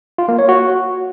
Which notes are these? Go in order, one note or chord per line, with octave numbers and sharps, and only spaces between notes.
F4
A#3
C#5
F#4